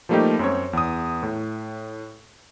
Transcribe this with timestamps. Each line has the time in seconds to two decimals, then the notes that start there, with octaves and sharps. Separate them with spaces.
0.09 F3 G3 A3 A#3 D#4 G4
0.39 F#2 C4 C#5
0.73 E2 D#6
1.23 A2